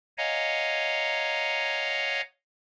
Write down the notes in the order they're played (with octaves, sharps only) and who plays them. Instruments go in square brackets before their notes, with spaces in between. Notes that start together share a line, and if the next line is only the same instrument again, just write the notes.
[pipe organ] C#5 D#5 F5 F#5 G#5 A#5